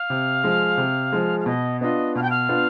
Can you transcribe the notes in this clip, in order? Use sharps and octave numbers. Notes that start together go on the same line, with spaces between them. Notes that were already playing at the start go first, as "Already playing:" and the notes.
Already playing: F5
C3
F3 G#3
C3
F3 G#3
F5
B2 D#5
B3 D4 F4 D#5
B2 F5
G5
F5
B3 D4 F4